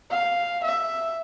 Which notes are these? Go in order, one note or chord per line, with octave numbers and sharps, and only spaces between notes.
F5
E5